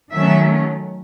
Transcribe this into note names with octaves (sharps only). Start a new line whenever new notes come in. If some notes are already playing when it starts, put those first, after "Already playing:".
D#3 F#3 A3 C#4 E5